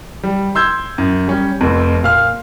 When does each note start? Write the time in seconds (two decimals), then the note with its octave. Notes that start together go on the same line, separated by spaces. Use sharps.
0.23 G3
0.55 C6 E6 G6 G#6
0.98 F#2
1.27 G3 C#4
1.61 F1 F2
2.03 A#2 F5 F6